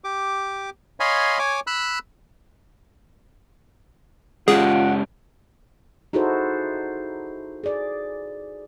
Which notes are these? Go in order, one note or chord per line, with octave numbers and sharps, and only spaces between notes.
G4 D6
C#5 D#5 F5 G#5 B5 C6
C#5 G#5 D6
B5 E6 F#6
G#3 C#4 F4 G4 G#4 F#5
D#4 E4 F#4 G#4 A4 C5
G#4 D5